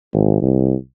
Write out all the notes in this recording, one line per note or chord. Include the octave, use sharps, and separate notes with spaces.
G#1
C2